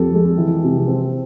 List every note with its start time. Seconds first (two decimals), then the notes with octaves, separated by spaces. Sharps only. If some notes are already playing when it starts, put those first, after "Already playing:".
Already playing: F2 G4 A4
0.14 G#3
0.38 E3
0.63 C3
0.87 C4